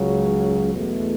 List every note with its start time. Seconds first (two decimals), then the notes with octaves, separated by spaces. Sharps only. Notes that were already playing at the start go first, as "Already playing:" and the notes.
Already playing: C#2 C#3 F#3
0.73 E2 B2 A3 E4